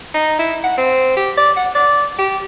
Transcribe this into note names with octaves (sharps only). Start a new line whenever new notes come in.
D#4
E4
F#5
C4
G4
D5
F#5
D5
G4